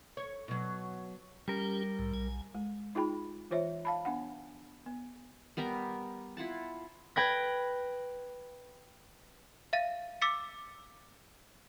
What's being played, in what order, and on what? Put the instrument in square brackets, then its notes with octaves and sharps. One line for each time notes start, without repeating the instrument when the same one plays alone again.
[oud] C#5
B2 F#3
[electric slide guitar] G3 A#4 [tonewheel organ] C#4 G4
[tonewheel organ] C2 A2
B1 G#5
[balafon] G#3
D#4 F4 G#4 G5 B5
E3 F4 C5 C#5 E5
F5 A5 B5
B3 D4 F#5
B3
[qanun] G3 B3 A#4 A#5
E4 F4 F#5 A5
[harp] B4 G5 G#6 A#6
[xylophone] E5 F5 A6 D#7
D6 E6 A6 B6 C#7